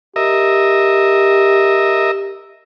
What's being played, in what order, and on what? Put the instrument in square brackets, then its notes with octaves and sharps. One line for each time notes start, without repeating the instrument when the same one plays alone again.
[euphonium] G4 [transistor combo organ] A#4 D#5 E5